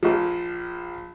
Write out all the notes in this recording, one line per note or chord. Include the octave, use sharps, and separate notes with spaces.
A#1 F3